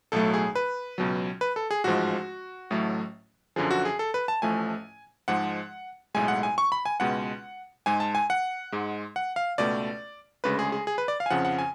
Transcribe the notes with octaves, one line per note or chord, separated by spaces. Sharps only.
B1 A2 F#3 A3 A4
G#4
B4
C#2 B2 F#3
B4
A4
G#4
A1 G#2 F3 G#3 F#4
A1 A2 F#3 A3
F#2 D3 F3 G#4
F#4
G#4
A4
B4
A5
A1 A2 F3 A3 G#5
G#2 F3 G#3 F#5
B1 A2 G#3 G#5
F#5
G#5
C#6
B5
G#5
C#2 B2 G#3 F#5
G#2 G#3 G#5
A5
G#5
F#5
G#2 G#3
F#5
F5
C#2 B2 A3 D5
D2 C#3 G#3 B4
G#4
G#4
G#4
B4
D5
F5
G#5
F2 C#3 F3 F#5
F#5
G#5